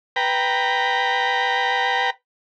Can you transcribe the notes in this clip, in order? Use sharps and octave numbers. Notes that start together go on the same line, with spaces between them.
B4 G5 A#5